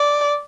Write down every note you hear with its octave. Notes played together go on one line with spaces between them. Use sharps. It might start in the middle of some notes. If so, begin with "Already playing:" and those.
Already playing: D5